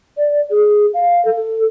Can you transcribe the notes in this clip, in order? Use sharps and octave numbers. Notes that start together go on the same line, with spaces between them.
D5
G#4
F5
A4